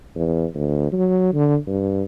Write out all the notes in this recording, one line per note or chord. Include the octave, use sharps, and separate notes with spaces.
E2
D2
F#3
D3
G2